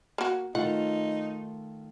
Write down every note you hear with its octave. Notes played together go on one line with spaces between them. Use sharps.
A#3 F#4
D#3 A3 D#4 F4 F#5